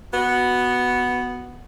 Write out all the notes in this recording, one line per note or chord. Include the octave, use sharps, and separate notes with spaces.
B3 F#4